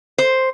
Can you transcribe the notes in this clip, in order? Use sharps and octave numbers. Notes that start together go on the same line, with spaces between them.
C5